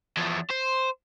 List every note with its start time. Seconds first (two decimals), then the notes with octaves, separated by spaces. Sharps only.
0.17 E2 F3
0.51 C5